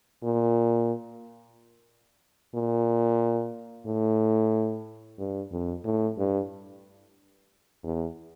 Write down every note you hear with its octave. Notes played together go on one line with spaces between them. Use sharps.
A#2
A#2
A2
G2
F2
A2
G2
E2